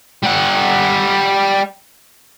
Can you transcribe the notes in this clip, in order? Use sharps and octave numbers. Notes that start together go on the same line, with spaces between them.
G3 F#5